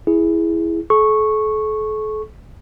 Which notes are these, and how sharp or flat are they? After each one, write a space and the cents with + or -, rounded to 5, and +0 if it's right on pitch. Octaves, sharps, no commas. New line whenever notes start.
E4 +0 G#4 +0
A4 -40 C#6 -10